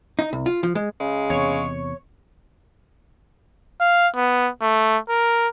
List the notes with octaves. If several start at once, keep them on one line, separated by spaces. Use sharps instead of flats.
D#4
C2
F4
F3
G#3
C#3 G#3
E2 C3 C#5
F5
B3
A3
A#4